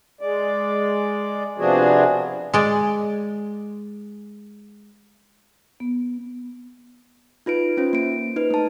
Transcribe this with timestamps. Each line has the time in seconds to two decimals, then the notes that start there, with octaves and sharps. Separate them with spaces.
0.21 G#3 D5
1.58 C3 F3 B3 D4 F#4 G#4
2.54 G#3 D5
5.80 B3
7.46 D#4 F4 B4 D7
7.77 C#4 F4 C5
7.93 A#3 D7
8.36 D#4 B4
8.50 A3 A5